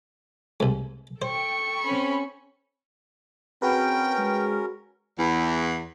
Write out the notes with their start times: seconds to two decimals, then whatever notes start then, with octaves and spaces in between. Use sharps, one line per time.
0.60 C2 G#2
1.22 A4 C5 G5 C#6
1.82 C4 C#4 B5
3.62 C4 C#4 F#4 G#4 A#4 B4 G5
4.18 G#3
5.18 E2